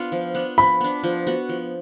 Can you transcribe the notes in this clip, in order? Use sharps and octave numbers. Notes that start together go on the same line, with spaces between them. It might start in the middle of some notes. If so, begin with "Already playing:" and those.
Already playing: B3 D4 F4
F3
B3 D4
F3 B5
B3 D4
F3
B3 F#4 B4
F3